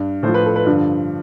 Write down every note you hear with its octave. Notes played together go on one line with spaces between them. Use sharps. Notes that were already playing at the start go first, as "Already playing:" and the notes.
Already playing: G2
A2 F3 C5
B4
A4
B4
G2 D3 F3